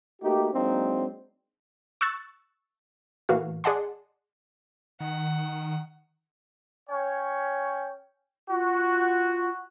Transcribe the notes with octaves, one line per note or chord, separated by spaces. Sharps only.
A3 A#3 D#4 F#4 G4
F#3 G#3 A#3 C4 D4 D#4
C#6 E6 F#6 A6
A2 E3 A#3 F#4 F5
G#4 D5 D#5 F#5 A5 C6
D#3 F#5
C#4 C#5 G5
F4 F#4